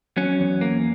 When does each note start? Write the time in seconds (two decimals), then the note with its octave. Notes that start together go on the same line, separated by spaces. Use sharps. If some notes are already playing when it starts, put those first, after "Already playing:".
0.17 F#3 C#4
0.40 E2
0.61 A#3